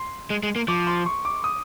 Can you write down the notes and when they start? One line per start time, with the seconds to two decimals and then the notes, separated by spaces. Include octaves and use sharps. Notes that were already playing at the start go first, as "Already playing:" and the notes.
Already playing: C6
0.30 G#3
0.43 G#3
0.56 A#3
0.68 F3 D6
0.87 C6
1.06 C#6
1.25 D6
1.44 D#6